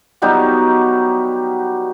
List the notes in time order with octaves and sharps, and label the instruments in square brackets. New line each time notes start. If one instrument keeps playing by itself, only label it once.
[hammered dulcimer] F#3 G3 B3 D#4